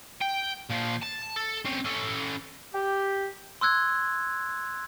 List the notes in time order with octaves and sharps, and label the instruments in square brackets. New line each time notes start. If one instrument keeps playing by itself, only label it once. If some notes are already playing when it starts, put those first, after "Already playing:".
[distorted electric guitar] G5
A#2 F3
A5
A4
C4 C#4
C#4 A4
[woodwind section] G4
[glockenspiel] C6 E6 F#6 G#6